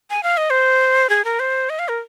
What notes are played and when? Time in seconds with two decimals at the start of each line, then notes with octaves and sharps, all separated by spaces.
0.10 G#5
0.23 F5
0.37 D#5
0.50 C5
1.10 G#4
1.25 A#4
1.40 C5
1.70 D#5
1.79 F5
1.88 A#4